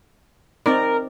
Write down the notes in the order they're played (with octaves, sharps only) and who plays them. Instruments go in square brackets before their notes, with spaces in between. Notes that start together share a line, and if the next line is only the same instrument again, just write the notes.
[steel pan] C4 D#4 D5 [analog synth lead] A#4